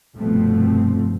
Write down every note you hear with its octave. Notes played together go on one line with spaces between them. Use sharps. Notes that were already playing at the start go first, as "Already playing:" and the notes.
F1 G2 B2 F3 A3 C4